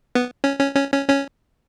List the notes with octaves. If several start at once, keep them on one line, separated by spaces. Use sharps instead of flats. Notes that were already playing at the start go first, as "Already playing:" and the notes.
B3
C#4
C#4
C#4
C#4
C#4